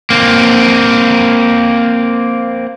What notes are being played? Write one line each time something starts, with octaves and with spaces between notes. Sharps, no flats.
A#3 C4